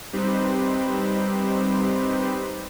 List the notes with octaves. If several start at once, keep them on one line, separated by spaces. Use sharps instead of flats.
G3 C4 D#4 G4 B4 C5